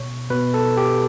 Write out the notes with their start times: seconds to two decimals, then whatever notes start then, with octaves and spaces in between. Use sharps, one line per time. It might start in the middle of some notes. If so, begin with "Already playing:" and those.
Already playing: B2 C#5
0.30 B2 B4
0.54 A4
0.77 G4